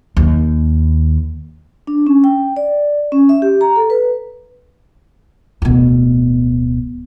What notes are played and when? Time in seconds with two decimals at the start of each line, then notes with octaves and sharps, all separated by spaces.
0.17 D#2
1.87 D4
2.07 C#4
2.24 G5
2.57 D5
3.12 C#4
3.29 E5
3.42 G4
3.61 A#5
3.76 A4
3.90 B4
5.62 D1 B2